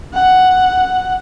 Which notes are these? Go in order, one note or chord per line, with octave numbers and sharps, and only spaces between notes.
F#5